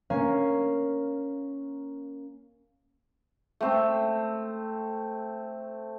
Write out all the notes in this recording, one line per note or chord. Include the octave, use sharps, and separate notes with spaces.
A#3 C#4 F5
A3 C4